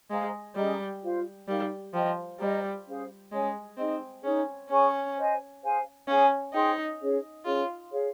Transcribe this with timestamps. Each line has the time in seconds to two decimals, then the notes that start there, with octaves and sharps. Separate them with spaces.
0.10 G#3 G#4 C5 F5 A#5
0.55 G3 C#4 G#4 D#5 A#5
1.02 F4 C5 F5
1.48 G3 D#4 A#4 F5
1.94 F3 C5 D#5 G5
2.40 G3 C5 D#5 A#5
2.85 C#4 G#4 C5 F5
3.32 G#3 C#4 G#4 C#5 G#5
3.77 C4 D#4 G#4 D#5
4.23 C#4 D#4 G#4 C#5
4.69 C#4 G#4 C#5 G#5 C#6
5.16 C5 D#5 G#5
5.62 G#4 C5 F5 G#5
6.08 C#4 G#4 C#5 F5 G#5
6.53 D#4 G#4 C5 G5 C6
6.99 C#4 G#4 C#5
7.45 C#4 F4 G#4 C#5
7.90 G#4 C#5 F5